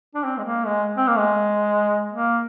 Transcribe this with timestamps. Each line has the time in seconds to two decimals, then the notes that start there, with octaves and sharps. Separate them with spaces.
0.15 D4
0.24 C4
0.38 G#3
0.44 A#3
0.65 G#3
0.97 C4
1.08 A#3
1.17 G#3
2.12 A#3